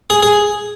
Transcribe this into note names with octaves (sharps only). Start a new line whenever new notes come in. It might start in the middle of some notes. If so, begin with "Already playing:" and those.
G#4
G#4